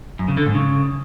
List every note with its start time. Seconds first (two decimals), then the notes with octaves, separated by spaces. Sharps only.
0.19 F#2
0.28 C#3
0.37 D3
0.46 G#2
0.55 C#3